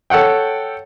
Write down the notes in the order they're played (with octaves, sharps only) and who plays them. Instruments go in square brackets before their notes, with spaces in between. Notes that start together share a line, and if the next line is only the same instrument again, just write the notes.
[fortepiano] A4 C#5 F#5 G5